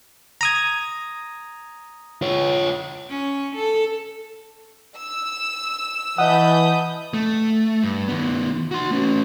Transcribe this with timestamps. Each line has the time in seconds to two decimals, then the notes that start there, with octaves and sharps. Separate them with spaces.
0.41 A#5 D#6 G#6
2.22 F4 C#5
3.10 C#4
3.55 A4
4.97 E6
6.18 E3 D#5 F#5 A5 B5 D#6 G6
7.14 A3
7.83 G2
8.08 D#3 B3
8.71 F#4 C6
8.91 A3 C#4